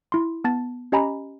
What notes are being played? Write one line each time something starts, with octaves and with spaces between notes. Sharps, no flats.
E4 C6
B3 A5 A6
C#4 G4 D#5 G#5 A#5 B5